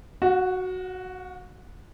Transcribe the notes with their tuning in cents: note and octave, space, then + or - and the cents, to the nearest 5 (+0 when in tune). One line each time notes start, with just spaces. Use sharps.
F#4 +0 F#5 -45